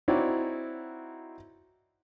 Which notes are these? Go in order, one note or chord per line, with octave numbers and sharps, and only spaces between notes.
C4 D#4 E4 F#4 C#5 D5